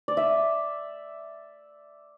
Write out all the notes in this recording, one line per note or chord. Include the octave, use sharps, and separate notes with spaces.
D5
E5